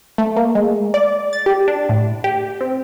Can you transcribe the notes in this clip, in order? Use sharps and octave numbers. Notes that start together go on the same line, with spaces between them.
A3
A#3
G#3
D5
A6
G4
D4
A2
G4
C4